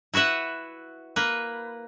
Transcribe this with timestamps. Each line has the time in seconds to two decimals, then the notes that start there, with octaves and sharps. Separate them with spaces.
0.14 E4 F#4 B4 E5 F#5
1.16 A#3 B4